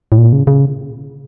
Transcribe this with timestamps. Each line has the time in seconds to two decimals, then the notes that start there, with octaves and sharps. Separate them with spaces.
0.12 A2
0.18 A#2
0.33 C#3
0.47 C#3